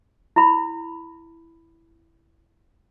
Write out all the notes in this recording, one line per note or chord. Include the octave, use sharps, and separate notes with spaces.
E4 B5